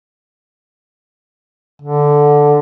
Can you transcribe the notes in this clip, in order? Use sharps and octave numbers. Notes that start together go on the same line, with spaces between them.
D3